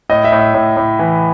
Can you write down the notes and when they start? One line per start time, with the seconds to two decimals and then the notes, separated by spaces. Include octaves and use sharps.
0.09 A2 D#5
0.24 E5
0.32 A2
0.39 E5
0.55 A2
0.77 A2
0.99 E3